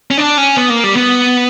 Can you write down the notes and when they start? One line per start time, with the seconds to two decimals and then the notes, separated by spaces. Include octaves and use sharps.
0.11 C#4
0.18 D4
0.38 C#4
0.57 B3
0.70 A#3
0.84 G3
0.96 B3